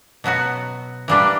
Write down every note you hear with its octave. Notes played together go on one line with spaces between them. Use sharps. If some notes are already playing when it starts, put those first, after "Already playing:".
B2 F#3 B3 F#4
E3 G3 A#3 D4 G4